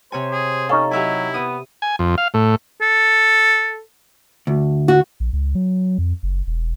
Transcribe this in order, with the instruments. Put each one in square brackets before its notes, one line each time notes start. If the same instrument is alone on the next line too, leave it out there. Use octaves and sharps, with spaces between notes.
[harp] C3 C#5 G#5 [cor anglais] C5
[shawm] G#4
[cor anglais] C#4 [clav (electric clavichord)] D#4 C#5 F5 [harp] A4
[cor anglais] F#3 [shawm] E4 [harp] G4 E5 G#5
[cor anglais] B3 [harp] D#6
[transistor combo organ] G#5
F2
F5
A2
[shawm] A4
[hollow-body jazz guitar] D2
[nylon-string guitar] F#4
[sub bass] A#1
C#2
F#3
F2
F#1
E1